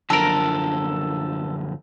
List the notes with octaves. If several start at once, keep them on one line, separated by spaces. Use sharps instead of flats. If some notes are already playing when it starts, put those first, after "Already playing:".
F#2 D3 F3 A4 A#4